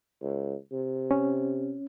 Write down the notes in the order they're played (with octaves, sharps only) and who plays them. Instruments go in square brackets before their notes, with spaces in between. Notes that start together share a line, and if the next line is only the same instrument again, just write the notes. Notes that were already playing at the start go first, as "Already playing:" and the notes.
[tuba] C#2
C3
[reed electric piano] C#4